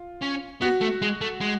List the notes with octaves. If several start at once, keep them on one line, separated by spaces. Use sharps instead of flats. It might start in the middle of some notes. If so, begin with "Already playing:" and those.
Already playing: F4
C#4
B3 F#4
A3
G#3
A3
G#3